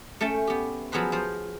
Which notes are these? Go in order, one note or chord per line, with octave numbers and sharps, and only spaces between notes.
A3 C#4 G5 A5
B3 G4
F3 F#3 B3 G#4 B4 C5
F3 C5